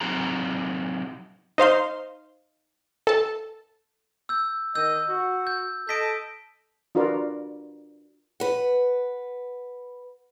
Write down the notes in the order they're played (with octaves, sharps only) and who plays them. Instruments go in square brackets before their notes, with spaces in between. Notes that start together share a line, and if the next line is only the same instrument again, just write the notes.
[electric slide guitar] F#3 C4 D#4 G#4 A#5
[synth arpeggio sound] D#4 C5 F5 C6
A4 A5
[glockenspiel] E6 G6
[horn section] D#3 D#5 [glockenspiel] E6 G6
[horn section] F#4
[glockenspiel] G6
[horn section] A4 D#5 A5 [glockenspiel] G6 B6 D7
[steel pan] D4 F4 F#4 A#4 B4 D5
[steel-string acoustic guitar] B4 F#5